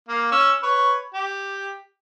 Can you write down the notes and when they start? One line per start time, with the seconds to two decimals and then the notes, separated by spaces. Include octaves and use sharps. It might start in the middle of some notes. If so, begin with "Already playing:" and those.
0.09 A#3 F5
0.31 C#4 E6
0.63 B4 C#5
1.14 G4